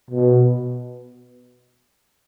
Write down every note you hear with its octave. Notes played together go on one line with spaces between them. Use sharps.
B2